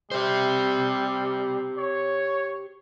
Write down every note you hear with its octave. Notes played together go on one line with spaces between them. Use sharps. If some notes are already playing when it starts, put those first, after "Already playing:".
G3 G4 C5
C#5